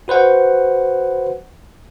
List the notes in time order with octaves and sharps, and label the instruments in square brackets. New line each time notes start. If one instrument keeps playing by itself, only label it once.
[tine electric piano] F#4 B4 C5 F#5